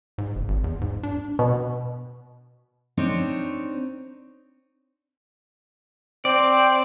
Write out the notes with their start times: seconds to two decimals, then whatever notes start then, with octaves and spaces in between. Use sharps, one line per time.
0.18 G#2
0.35 F#1
0.48 G#1
0.64 E2
0.81 G#2
1.03 D4
1.39 B2
2.98 C4 D4 D#4 C#5
6.25 C4 D5